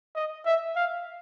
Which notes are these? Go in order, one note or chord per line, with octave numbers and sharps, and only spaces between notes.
D#5
E5
F5